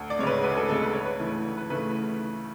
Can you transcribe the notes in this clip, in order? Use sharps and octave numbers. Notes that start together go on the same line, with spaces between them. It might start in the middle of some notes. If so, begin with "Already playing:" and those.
Already playing: D2
D5
C#3 G#3 B4 C#5
D2 B4
G#4
A4
C#3 G#3 A4
B4
D2 C#5
B4
C#3 E3 A3
D2
B4
C#3 E3 A3 B4